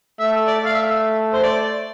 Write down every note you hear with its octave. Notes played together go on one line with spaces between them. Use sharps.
A3 E5
D5
A3 F5
E5
C5
D5